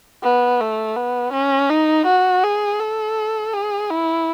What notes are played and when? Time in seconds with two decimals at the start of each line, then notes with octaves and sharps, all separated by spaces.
0.23 B3
0.60 A3
0.96 B3
1.33 C#4
1.70 D#4
2.06 F#4
2.44 G#4
2.80 A4
3.53 G#4
3.90 E4